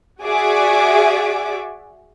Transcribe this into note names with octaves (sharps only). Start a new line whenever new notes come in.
F#4 G#4 D5 E5 D6